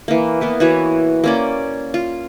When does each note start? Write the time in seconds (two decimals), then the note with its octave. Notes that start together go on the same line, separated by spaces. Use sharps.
0.08 E3 A#3
0.41 A#3 B3 E4
0.60 E3 E4 F#4 C#5
1.24 A#3 C#4 D5
1.94 F4